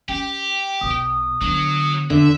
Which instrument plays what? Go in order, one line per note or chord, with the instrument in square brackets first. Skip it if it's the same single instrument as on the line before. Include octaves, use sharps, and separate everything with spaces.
[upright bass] C#4 [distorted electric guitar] G4 [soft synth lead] G5
[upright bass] B1 B2 [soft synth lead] D#6
[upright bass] D3 B3 [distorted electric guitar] F#3
[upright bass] E2 [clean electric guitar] D3 [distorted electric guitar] E5